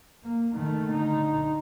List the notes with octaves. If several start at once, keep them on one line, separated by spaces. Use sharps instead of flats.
A#3
D#3 A3
D3 D#4